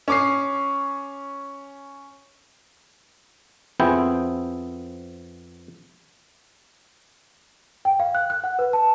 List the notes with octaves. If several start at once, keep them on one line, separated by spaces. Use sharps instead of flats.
C#4 D6 C7
F2 B3 C4 E4 G#4 G5
G5
F5
F#6
F#6
F#5
B4
A5